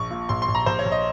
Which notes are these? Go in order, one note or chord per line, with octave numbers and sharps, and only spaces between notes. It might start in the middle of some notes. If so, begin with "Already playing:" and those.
Already playing: A#1 C#6
A#2
A#1 C6
C6
A#1
A#5
A#1 C5
C#5
A#1
D#5